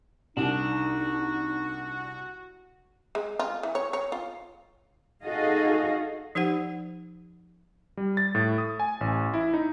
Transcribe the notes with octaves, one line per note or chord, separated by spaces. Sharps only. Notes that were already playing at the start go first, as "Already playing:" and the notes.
C2 D4 D#4 F#4
G#3
F4
E3
C#5
C#5
F4
D#4 F#4 G#4 A4 D#5 F5
F3 D#4 G4 C5 F#5
G3
A6
A2
D#6
G#5
A1
E4
D#4